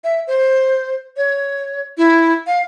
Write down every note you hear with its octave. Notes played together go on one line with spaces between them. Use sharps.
E5
C5
C#5
E4
F5